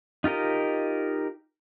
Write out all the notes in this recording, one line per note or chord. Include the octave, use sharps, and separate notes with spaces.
D#4 F4 G4 A#4 D#5